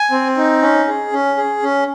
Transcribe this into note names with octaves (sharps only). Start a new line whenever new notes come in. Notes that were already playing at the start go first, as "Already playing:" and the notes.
Already playing: G#5
C4
D#4
C#4
G#4
C#4
G#4
C#4